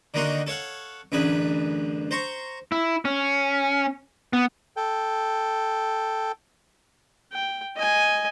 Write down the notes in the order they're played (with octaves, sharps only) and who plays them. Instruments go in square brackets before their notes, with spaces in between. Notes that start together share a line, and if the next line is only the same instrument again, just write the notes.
[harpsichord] D3 D#3 A#3 D#4 F#4 C6
A4 C#5 F5 F#5
A1 F#2 D3 G#4 B4
C5 A#5 C6 C#6
[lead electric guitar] E4
C#4
B3
[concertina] A4 G5
[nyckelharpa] G5
D#5 G#5